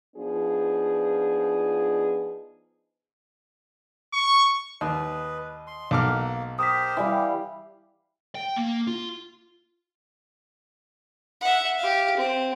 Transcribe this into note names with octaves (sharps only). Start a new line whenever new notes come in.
F3 B3 D4 D#4 F4 G#4
C#6
D#2 B4 D#5
C6
B1 A#3 D6 F6
G4 A#4 C5 D#6 B6
E3 G3 G4 F5
G5
A#3
F4
E5 F#5
G4 F5
C4